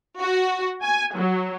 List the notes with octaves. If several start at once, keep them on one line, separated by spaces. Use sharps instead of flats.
F#4
G#5
F#3